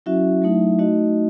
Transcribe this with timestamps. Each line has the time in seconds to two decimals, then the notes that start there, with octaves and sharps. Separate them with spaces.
0.06 F#3 C#4 E4 F#4 E5
0.42 F#3 A3 D#4
0.79 A3 D#4 F#4 D#5